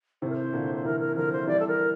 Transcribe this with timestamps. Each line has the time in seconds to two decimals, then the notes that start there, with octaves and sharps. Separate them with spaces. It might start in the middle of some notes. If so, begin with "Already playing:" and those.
0.22 A2 C3 C5
0.30 A#4
0.36 C5
0.53 A#2 D3
0.74 C5
0.85 C3 E3 A#4
1.00 A#4
1.16 D3 F3 A#4
1.32 C5
1.47 E3 G3 D5
1.60 A4
1.68 A#4